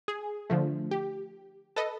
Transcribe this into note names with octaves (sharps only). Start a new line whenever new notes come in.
G#4
D3 F3 A3
G4
A4 B4 D#5